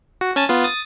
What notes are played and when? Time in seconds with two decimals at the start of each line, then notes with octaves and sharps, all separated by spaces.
0.21 F#4
0.36 C#4 G#5 A5
0.49 B3 F4
0.64 D#6 A6